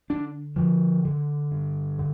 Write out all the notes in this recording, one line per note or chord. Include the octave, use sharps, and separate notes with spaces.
D3 D4
D3 F3
D3
G2
D3